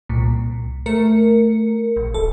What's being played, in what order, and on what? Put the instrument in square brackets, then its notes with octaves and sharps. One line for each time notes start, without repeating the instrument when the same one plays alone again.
[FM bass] C2 [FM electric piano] A#2
[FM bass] A3 [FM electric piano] A#4 C#7
[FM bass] A#1
[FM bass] D1 [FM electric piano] A4